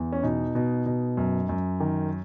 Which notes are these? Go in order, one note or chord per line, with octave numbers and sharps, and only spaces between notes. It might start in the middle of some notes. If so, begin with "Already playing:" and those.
Already playing: E2
C#4
B2 D#4
B2
B2
F#2
F#2
D#3